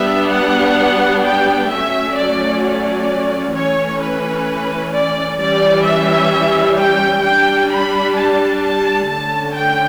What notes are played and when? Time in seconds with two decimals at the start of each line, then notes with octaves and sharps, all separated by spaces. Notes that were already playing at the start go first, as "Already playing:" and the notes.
Already playing: G3 B3 D4 E5
0.31 F#5
1.23 G5
1.70 F#3 A3 C#4 E5
2.16 D5
2.62 D5
3.54 E3 A3 C#4 C#5
4.01 B4
4.93 D5
5.39 E3 G3 C#4 D5
5.85 E5
6.77 G5
7.24 G3 D4 G5
7.70 B5
8.16 A5
8.63 A5
9.09 D3 A3 C#4 A5
9.55 G5